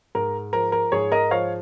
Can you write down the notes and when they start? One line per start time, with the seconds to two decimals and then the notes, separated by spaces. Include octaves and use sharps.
0.15 G#2 A#4
0.53 F3 A#4
0.72 A#4
0.92 G#2 G#4 C#5
1.12 A#4 D#5
1.31 F3 C#5 F5